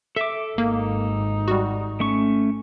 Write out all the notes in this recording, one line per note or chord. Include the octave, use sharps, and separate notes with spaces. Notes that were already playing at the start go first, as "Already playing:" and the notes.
A4 E5 D6
G#1 A#3 D#4
G3 F#4
A3 C#4 C#6